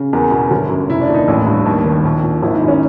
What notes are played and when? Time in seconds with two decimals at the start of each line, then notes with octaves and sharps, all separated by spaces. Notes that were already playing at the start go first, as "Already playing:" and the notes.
Already playing: C#3
0.13 E2 A#4
0.31 B2
0.51 G1
0.69 F#2
0.89 F1 E4
1.01 D4
1.09 D#2
1.14 D#4
1.28 A1 E4
1.46 G2
1.66 D#2
1.86 D#3
2.04 A#1
2.23 A#2
2.42 G#1 E4
2.56 D#4
2.62 F#2
2.68 C#4